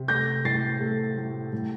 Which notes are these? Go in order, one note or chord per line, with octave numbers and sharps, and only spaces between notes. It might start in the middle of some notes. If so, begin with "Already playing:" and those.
Already playing: C3
A3 G6 A#6
A2 A6 C7
A3
A2
A2